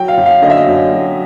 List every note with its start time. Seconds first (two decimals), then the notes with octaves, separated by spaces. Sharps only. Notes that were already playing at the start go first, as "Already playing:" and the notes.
Already playing: F#3 G5
0.08 F5
0.17 F#2
0.26 F5
0.42 D3 D#5
0.50 E5
0.57 D#5
0.68 F#2
0.93 F#3